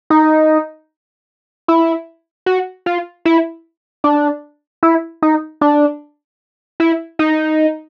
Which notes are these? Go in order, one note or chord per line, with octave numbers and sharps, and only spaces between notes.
D#4
E4
F#4
F4
E4
D4
E4
D#4
D4
E4
D#4